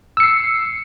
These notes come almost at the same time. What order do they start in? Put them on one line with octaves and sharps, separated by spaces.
E6 C#7 C7